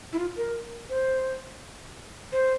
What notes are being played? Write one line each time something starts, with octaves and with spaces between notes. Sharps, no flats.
E4
F4
A#4
C5
C5